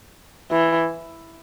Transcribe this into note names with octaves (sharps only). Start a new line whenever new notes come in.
E3